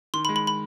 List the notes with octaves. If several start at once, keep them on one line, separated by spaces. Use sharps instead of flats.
D#3 C6
B5
G#3
B5
B5